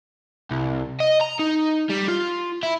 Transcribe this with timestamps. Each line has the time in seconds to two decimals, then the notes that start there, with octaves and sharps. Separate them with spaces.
0.51 C2
1.00 D#5
1.21 A#5
1.39 D#4
1.89 G3
2.08 F4
2.63 E4